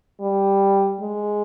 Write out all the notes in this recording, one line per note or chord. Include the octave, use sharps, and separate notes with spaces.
G3
G#3